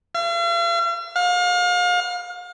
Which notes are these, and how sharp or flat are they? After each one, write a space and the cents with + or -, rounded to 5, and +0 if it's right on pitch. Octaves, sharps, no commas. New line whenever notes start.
F5 -45
F5 +35